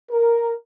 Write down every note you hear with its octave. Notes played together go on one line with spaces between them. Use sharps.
A#4